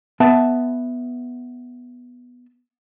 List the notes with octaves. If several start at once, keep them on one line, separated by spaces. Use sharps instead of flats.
B3 E5 A5